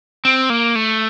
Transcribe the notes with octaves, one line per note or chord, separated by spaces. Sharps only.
C4
A#3
A3